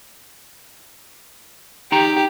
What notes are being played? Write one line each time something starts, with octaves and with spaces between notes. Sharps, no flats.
D#4 G4 G5 A#5